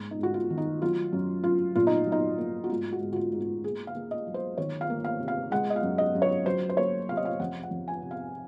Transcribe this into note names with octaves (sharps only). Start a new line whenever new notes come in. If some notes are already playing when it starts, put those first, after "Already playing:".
Already playing: G#2 A#3
D#4
G#2 F#4
F4
D#3
D#4
F#3 F4
F#2
F#2 F4
A#2 F4
D#4
F#3
D#4
A#3
F#4
G#2 F4
F#4
G#2
F#4
F4
G#2
F4
A#3 G#4
F5
A#3
D#5
F#3
C5
D#3 C#5
F5
A#3
F5
C3
F5
G#3 F#5
D#5
F5
F#2
D#5
F#2
C#5
F#3 C5
C5
A#3 C#5
C3 F5
D#5
F5
F2 F#5
F#5
F2
G#5
C3
F5